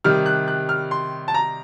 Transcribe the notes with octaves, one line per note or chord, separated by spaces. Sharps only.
C3 D#3 G3 F6
F#6
F#6
F6
C6
A5
A#5